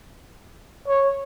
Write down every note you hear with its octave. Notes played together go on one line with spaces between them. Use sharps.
C#5